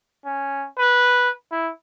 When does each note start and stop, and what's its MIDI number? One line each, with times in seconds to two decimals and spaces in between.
0.25 0.66 61
0.78 1.30 71
1.52 1.70 64